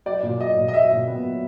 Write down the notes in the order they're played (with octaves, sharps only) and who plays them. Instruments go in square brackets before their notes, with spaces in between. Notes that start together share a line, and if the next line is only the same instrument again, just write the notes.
[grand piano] F#3 [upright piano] D5
[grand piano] A#2
[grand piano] F#3 [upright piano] D#5
[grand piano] A#2
[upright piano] D#5
[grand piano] F#3 [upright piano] E5
[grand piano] A#2
B3
F#3